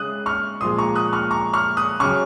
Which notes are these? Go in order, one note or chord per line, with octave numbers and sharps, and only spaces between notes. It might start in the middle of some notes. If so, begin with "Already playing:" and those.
Already playing: C#3 G#3 D#6 F#6
C#6 F6
A#2 F3 G#3 C6 D#6
A#5 C#6
D#6 F#6
C#6 F6
A#5 C#6
C#6 F6
D#6 F#6
C#3 F#3 C#6 F6